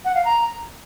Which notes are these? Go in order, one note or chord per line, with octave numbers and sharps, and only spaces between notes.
F#5
F5
A#5